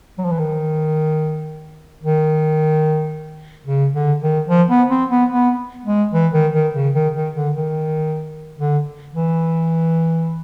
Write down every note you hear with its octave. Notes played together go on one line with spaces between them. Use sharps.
F#3
F3
E3
D#3
D#3
C#3
D3
D#3
F3
B3
C4
B3
B3
G#3
E3
D#3
D#3
C#3
D#3
D#3
D3
D#3
D3
E3